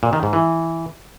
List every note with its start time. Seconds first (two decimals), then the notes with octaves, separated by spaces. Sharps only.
0.03 A#2
0.13 D#3
0.23 G#2
0.33 E3